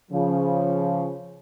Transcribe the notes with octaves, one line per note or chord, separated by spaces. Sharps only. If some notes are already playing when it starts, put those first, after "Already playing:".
C#3 F3